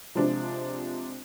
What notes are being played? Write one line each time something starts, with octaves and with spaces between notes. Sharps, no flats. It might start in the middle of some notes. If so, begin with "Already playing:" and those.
C3 F3 G#3 D4